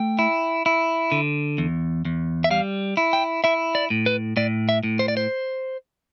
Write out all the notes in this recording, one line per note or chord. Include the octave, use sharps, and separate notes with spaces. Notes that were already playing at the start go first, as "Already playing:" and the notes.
Already playing: A3 G5
E4
E4
D3
E2
E2
E5
G3 F5
E4
G5
E4 E5
D5
A2
B4
A2 D5
E5
A2
C5
D5
C5